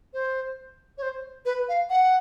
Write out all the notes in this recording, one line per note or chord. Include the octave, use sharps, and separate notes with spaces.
C5
C#5
C5
B4
F5
F#5